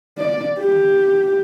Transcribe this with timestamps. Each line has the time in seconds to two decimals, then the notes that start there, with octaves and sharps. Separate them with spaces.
0.18 D5
0.59 G4